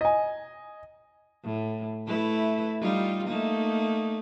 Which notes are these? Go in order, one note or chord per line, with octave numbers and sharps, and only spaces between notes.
D#5 G#5
A2
A3 E4 B4
G3 D#4 F4
A3 A#3 D#4